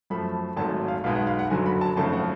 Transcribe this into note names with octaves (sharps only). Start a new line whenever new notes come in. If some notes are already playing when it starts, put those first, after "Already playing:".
F#2 F3 A3 B5
G#1 G#2 F#3 A3 A5
F5
B1 B2 G#3 F5
F#5
F5
F#5
F#1 F#2 D3 F#3 G#5
B5
A5
G#1 F#2 C#3 F3 A3 A5
F#5